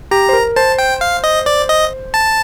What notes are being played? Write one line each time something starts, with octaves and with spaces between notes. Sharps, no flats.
G4 A#5
C5
A#4
C5 A5
G5
F5
D#5
D5
D#5
A5